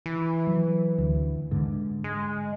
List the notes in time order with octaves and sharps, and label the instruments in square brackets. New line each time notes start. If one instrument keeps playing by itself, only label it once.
[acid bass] E3
[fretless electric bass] F#3
D2
G#2 D3
[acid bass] G#3